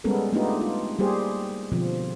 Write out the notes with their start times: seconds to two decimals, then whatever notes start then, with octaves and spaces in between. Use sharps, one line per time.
0.04 G3 G#3 B3 C#4 A4 A#4
0.33 A3 B3 D4 D#4 F4 G4
0.61 F4
0.99 G3 A#3 G4 G#4 C5
1.72 B2 D3 F3 C4